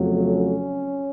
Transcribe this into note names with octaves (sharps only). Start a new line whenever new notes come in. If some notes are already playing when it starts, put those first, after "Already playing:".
Already playing: F2 C#3 F#3 A3
C#4